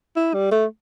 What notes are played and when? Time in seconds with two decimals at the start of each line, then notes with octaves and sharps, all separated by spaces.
0.16 E4
0.34 G3
0.51 A3